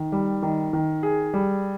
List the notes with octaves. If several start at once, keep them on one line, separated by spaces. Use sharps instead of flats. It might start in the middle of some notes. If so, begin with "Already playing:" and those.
Already playing: D#3
G3
D#3
D#3
G#4
G3